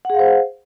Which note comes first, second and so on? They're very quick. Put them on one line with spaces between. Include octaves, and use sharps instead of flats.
F#5 G#4 F5 C5